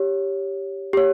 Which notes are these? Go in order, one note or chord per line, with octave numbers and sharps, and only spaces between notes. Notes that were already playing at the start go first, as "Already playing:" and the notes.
Already playing: G4 C#5
G4 C#5